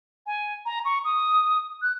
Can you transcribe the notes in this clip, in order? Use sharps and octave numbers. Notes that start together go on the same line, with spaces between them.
G#5
A#5
C#6
D#6
F#6